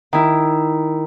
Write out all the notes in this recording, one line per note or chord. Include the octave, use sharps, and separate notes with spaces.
D#3 E4